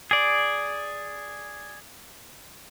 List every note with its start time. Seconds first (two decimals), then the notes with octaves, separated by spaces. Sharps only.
0.11 G#4 D5